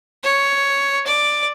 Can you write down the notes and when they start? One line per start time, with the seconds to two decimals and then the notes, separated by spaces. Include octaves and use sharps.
0.24 C#5
1.07 D5